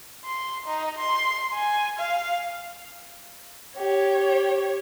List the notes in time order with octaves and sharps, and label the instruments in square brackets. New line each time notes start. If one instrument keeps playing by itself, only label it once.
[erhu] C6
D#4
C6
G#5
F5
[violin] G4 C#5